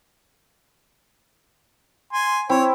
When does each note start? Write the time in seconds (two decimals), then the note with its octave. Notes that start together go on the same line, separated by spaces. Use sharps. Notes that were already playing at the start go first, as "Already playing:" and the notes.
2.13 G#5 C6
2.49 C4 E4 C#5